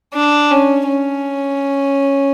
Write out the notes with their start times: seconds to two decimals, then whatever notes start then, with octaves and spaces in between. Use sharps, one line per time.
0.14 D4
0.51 C#4
0.87 C#4